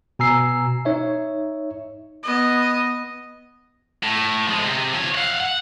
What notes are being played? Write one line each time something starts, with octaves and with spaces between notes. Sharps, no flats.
B2 G#5 A#5 E6 C7
D#4 C#5 E5
B3 D#5
A2
F3 G#3
C3
F3 C#5
F5 F#5
F#5